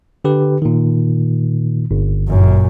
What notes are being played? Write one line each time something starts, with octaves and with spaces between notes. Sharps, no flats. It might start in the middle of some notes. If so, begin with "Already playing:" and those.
D3 G4 B4
A#2 D#3
G1
F#2 A#2